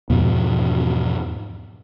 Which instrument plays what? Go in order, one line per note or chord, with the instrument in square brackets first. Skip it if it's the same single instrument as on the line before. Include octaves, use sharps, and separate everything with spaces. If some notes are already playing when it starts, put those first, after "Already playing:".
[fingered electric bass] E2 G#2 B2 F3